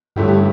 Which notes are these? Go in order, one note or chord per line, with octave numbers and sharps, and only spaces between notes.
G2 D3 A3 C#4 E4 G4